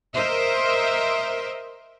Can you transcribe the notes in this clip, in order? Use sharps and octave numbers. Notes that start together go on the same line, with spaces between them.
A#4 C5 D#5 E5